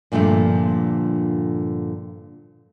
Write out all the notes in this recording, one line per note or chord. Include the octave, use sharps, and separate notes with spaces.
G2 A#2 D3 F3 A3